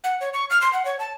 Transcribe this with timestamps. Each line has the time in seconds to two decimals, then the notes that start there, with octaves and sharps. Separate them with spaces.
0.04 F#5
0.21 C#5
0.33 C#6
0.50 F6
0.61 C6
0.73 F#5
0.85 C#5
0.99 A5